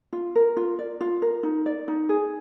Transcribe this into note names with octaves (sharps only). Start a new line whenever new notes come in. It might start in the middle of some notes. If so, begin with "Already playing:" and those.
F4
A#4
F4
D5
F4
A#4
D#4
D5
D#4
G#4